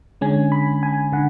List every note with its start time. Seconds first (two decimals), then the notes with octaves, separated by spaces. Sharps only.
0.21 D3 G#3 C#4 G#5
0.52 B5
0.83 G#5
1.13 D3 F#5